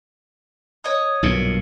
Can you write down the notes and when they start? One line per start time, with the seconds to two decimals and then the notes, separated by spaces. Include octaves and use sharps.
0.84 C#5 D#5 D#6
1.23 B1 G2 A#2